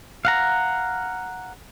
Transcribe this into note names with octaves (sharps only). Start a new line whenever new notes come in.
F5 F#5 A#5